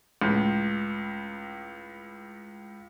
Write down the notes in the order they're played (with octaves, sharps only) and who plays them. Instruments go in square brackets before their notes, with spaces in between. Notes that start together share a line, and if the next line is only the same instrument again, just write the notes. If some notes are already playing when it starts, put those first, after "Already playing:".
[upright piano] C#2 A2